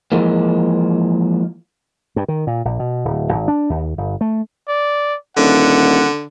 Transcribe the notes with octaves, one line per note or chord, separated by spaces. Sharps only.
E3 F3 G#3 A#3
G2
D#3
A#2
A#1
B2
D1
G#1
D4
D#2
G1
A3
D5
D#1 D3 F#5